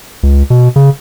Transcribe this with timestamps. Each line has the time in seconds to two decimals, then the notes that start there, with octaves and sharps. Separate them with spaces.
0.23 C#2
0.50 B2
0.76 C#3